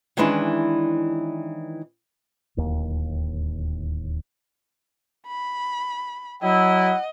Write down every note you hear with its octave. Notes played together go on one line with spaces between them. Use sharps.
D#3 E3 G#3 C#4 D4 E4
D1 D#2
B5
F#3 E4 D#5 F#5